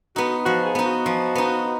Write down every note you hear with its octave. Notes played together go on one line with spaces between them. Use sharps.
B3 D#4 F#4
F3 F#4
G#4
B3 D#4
F#4
F3
B3 D#4